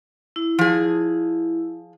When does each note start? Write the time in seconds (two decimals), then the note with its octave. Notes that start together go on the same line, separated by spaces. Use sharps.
0.36 E4
0.59 F3 G#4